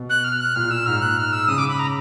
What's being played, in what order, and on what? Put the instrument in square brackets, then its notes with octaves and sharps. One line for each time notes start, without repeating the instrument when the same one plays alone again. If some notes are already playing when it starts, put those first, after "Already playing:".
Already playing: [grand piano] B2
[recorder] F#6
F6
F#6
[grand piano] A#2 [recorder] F6
[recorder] E6
[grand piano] G#2 [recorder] F6
[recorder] F#6
F6
E6
[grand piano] C#3 [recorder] D#6
[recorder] D6
B5
A#5